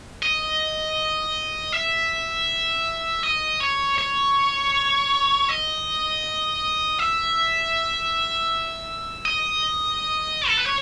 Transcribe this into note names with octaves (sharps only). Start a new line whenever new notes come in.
D#5
E5
D#5
C#5
C#5
D#5
E5
D#5
A4
B4
C#5